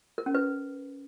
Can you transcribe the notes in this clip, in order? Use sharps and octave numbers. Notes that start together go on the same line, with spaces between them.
A#4
C#4
B4